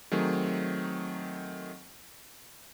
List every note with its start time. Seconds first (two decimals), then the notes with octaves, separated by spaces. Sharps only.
0.11 D#3 F#3 A3 C4 G#4